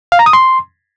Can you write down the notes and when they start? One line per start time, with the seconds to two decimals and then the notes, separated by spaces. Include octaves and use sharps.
0.12 F5
0.19 A#5
0.26 D#6
0.33 C6